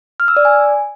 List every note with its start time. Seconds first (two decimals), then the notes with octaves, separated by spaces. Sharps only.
0.20 F6
0.28 E6
0.37 D5
0.45 G#5